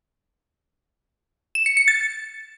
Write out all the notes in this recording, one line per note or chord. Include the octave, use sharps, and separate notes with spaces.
E7
C#7
C#7
A6